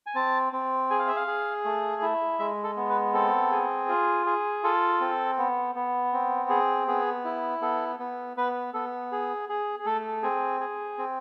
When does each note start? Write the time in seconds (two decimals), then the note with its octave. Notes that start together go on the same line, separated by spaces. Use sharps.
0.06 G#5
0.15 C4 A5
0.52 C4
0.90 G#4 G#5
0.99 F5
1.08 E5
1.16 F5
1.27 G#4
1.65 A3
2.02 E4
2.39 G#3 E5
2.64 A4
2.77 B3
2.90 B4
3.13 C4 A4
3.51 G#4
3.89 F4
4.26 G#4
4.63 F4 A4
5.01 C4
5.38 B3
5.75 B3
6.13 C4
6.50 G#4
6.87 B3 G#4
7.25 E4
7.62 B3 A4
7.99 B3
8.37 B3 B4
8.74 B3 A4
9.12 G#4
9.49 G#4
9.79 G#4
9.86 A3 A4
10.23 C4 G#4
10.61 G#4
10.98 C4